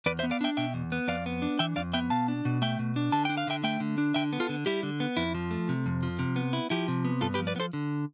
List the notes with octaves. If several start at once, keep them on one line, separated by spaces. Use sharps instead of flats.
E2 B4 D5
C5 E5
B3
D5 F5
D4 E5 G5
B2 E5 G5
E2
B3
F2 D5 F5
B3
D4
E3 E5 G5
F2 D5 F5
B3 E5 G5
B2 F5 A5
D4
B2
A3 E5 G5
B2
D4
D3 A5
D4 G5
F5
D3 E5 G5
A3 E5 G5
D3
D4
D3 E5 G5
B3
F4 A4
D3
G3 E4 G4
D3
B3
F2 E4
F3
A3
C3
F2
F3
C3
B3
E4
F3 E4 G4
C3
B3
G2 F4 A4
G4 B4
F3
B4 D5
B3
A4 C5
D3